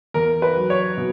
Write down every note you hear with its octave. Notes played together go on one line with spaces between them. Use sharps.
E2 A#4
B4
F#3
C#5
B2